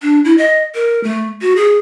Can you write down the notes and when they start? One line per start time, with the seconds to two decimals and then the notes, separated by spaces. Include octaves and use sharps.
0.02 D4
0.25 E4
0.38 D#5
0.75 A#4
1.04 A3
1.42 F#4
1.56 G#4